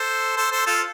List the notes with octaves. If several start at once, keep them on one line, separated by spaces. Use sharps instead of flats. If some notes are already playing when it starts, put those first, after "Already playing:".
Already playing: A4 C5
A4 C5
A4 C5
F4 A4